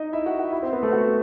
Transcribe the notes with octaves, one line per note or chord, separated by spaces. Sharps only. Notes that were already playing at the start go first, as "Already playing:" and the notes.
Already playing: D#4 D#5
E4 E5
F#4 F#5
F#4 F#5
E4 E5
C4 C5
B3 B4
A3 A4
F#4